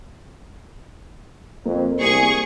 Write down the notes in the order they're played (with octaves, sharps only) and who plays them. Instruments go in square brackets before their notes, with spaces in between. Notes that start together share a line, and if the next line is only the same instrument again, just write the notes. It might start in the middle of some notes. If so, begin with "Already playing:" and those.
[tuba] F2 [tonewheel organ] A#3
[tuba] C2 [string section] G#4 C#6